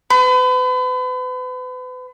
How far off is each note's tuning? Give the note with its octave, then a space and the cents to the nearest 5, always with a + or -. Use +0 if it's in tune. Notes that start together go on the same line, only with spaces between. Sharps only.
B4 +40